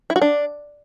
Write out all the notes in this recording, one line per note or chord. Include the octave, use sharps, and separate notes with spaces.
E4
F#4
D4